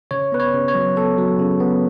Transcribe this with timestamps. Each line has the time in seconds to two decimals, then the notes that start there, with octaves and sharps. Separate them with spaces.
0.11 C#3 C#5
0.32 B3 B4
0.40 C#5
0.53 C#3
0.68 C#5
0.75 F#3
0.96 B3 A4
1.18 F#3
1.39 C#3
1.60 B3